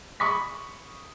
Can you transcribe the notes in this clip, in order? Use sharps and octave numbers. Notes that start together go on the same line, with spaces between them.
B5 C#6 D#6 B6